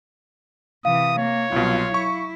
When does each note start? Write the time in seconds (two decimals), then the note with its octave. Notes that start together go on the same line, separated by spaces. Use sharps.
0.85 C3 E3 F5 D#6
1.18 A#3 C#5
1.52 C2 B2 F#3 F4
1.94 E4 C#6